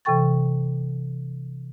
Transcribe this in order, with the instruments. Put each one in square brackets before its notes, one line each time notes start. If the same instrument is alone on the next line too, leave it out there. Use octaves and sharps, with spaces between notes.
[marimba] C3 E3 A4 G5 C#6 A6